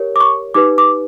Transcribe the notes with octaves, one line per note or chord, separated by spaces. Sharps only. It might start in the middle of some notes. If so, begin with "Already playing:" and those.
Already playing: G4 A#4 C#5
D6
C#6
D#4 G4 B4 D6
D6